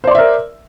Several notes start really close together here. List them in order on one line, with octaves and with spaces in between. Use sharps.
C5 D5 C6 E5 A#4